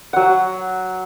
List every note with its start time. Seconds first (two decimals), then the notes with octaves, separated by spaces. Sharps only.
0.13 F#3 F#5